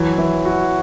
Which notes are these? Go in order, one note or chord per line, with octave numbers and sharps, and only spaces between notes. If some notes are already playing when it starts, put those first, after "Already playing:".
Already playing: E3 F#3 E4
E3
F#4